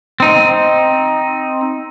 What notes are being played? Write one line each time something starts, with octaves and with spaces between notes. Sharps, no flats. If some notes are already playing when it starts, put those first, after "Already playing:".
C4 D#4